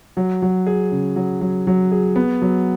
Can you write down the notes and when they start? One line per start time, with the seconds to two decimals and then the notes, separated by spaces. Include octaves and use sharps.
0.17 F#3
0.42 F#3
0.67 G#4
0.91 C#3
1.16 F#3
1.41 F#3
1.67 F#3
1.92 G#4
2.16 B3
2.42 F#3